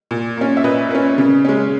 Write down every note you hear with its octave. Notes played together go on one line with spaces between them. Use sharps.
A#2
A#3 C#4
E5
A#2 B4 D#5
A#3 C#4
C#3
G#3 C#4